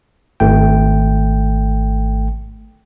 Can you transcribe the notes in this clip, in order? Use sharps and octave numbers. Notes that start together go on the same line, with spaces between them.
G#1 A3 G5